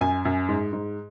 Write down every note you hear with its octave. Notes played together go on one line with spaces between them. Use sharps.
F#2 G#5
F#2
G#2
G#2